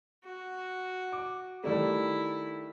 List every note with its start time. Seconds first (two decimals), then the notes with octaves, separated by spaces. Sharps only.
0.24 F#4
1.12 D6
1.64 D#3 G3 A3 E4